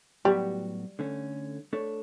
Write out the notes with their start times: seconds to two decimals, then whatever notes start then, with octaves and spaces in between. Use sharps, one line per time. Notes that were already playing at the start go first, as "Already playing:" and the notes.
0.25 A2 F#3 G3 B3 F#4
0.99 D3 A3 C#4
1.73 A3 D4 A4 C#5